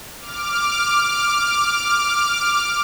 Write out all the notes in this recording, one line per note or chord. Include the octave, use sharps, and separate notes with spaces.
D6 F6